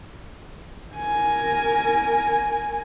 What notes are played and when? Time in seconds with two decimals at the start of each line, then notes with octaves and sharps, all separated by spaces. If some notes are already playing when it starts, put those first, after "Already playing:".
0.95 A#4 G#5